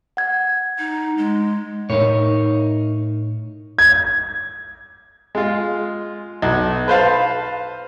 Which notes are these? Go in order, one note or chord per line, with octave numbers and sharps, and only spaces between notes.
F#5 G#6
D#4
G#3
A2 D#4 A#4 C#5
G#6
G#3 F4
B1
B4 C5 F5 A5